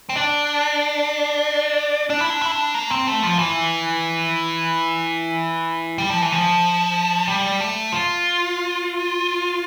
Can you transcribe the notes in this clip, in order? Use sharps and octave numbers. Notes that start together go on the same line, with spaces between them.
C4
D4
D4
E4
D4
E4
D4
A#3
C4
A3
F3
E3
G3
F3
E3
F3
G3
A3
F4